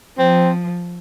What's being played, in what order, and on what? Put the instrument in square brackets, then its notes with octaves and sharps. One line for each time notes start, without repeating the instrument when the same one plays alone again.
[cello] F3 [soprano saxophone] C4